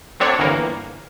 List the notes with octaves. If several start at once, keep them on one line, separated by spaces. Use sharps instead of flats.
F#3 A3 C4 D4 C#5 D5
G1 E3 A#3